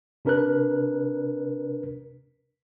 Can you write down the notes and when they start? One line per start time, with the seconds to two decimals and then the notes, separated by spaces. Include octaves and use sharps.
0.25 C3 D4 A#4 B4 F#6